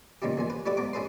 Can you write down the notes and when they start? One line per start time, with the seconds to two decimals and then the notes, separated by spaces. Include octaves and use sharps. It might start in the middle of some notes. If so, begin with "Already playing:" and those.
0.22 G2 A#2 C#3 D#4 E4 G4
0.37 E2 A#2 G#5
0.50 B4
0.66 A3 E4 G4 B4 D5 E5
0.77 G#2 B3 A#5 D6
0.93 C#4 E4 G#4 A4 B4 C6